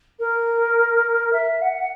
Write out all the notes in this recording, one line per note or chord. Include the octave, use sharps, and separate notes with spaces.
A#4
E5
F#5